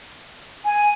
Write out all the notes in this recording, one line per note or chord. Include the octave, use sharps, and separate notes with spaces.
G#5